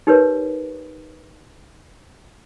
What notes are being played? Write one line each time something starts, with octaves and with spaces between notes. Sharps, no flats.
D#4 G4 A#4 B4 C#5